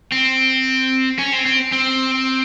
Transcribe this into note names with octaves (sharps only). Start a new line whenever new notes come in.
C4
C#4
C4
C4
C4